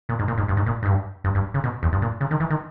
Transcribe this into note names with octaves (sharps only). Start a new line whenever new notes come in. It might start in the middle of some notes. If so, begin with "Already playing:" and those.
A#2
G#2
A#2
G#2
G2
G#2
A#2
G#2
G2
G2
G2
C#3
B2
E2
G2
A#2
C#3
D#3
E3
D#3